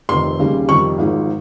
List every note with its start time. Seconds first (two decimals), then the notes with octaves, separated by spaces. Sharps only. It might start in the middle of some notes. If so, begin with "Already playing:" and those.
0.09 F1 F2 C3 D#3 C6
0.39 D#2 C#3 G3
0.69 F2 C3 D#3 G3 C#6
0.98 G#1 G#2 F3